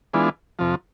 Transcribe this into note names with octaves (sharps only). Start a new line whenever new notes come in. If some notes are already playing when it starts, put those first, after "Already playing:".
E3 G#3 B3 D4 F4
F2 C3 F3